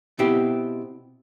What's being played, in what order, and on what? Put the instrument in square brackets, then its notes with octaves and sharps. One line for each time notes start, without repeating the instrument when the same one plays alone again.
[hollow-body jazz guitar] B2 C4 E4 G4